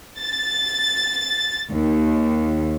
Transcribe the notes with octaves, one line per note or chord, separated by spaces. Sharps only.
A6
D#2